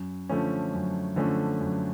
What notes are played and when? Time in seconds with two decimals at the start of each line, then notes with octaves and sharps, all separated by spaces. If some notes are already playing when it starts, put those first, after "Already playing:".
Already playing: F#2
0.29 D3 F3 A3 C#4
0.73 F#2
1.16 D3 F3 A3 C#4
1.60 F#2